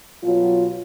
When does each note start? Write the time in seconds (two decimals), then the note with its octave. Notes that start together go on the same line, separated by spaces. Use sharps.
0.24 B2 F#3 F4